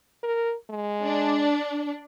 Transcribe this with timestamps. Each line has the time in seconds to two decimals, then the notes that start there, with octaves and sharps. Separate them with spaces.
0.23 A#4
0.70 G#3
1.04 D4